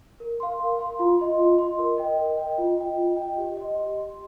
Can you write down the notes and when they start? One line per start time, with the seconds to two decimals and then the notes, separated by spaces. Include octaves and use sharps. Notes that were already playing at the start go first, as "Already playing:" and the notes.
0.20 A#4
0.40 F5 C6
0.59 A#4
0.79 F5 C6
0.99 F4
1.19 D#5 C6
1.39 F4
1.59 D#5 C6
1.79 A#4
1.98 D#5 G5
2.18 A#4
2.37 D#5 G5
2.58 F4
2.78 D#5 G5
2.98 F4
3.16 D#5 G5
3.37 G4
3.57 D#5 C6
3.76 G4
3.96 D#5 C6